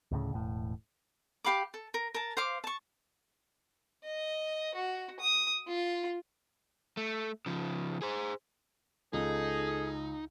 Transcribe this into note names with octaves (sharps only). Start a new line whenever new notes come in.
D2 A2 C#3
E1 A2
G4 F5 B5 D6
A4
A#4
A#4 A5
C5 F5 D6
A5 C#6
D#5
F#4
D#6
F4
A3
C#3 F3
G#4 C5
C#2 D#4 G#4 A4